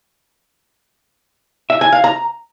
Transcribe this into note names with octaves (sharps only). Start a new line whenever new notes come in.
E5
G#5
F5
A#5